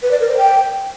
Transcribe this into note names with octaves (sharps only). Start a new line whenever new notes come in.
B4
D5
A#4
C5
G5